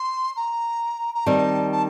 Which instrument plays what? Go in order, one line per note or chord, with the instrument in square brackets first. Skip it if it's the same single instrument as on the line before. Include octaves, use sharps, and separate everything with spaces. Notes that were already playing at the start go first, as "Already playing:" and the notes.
Already playing: [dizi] C6
A#5
A#5
[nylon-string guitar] D#3 G3 C4 D#4 [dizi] A5
[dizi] A5